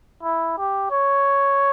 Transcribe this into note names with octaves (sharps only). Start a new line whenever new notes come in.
E4
G4
C#5